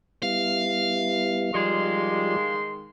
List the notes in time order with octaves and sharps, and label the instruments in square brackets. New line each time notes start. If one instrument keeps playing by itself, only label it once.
[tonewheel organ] G3 B3 E4 [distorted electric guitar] F5
[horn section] D#3 G#3 C6 [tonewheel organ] F3 G3 D5